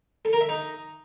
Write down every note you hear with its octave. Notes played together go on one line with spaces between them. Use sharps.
A4
A#4
E5
D#4